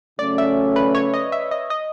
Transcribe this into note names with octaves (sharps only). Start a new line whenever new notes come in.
C#3 F#3 A3 C#4 D5
E5
B4
C#5
D#5
E5
D#5
D#5